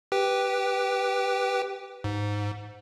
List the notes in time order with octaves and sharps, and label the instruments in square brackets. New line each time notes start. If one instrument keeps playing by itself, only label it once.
[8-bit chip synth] G4 B4 G5
G#2